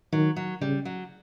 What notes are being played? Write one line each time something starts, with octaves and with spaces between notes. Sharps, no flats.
D#3 F#3
F#3
C#3 G3
F#3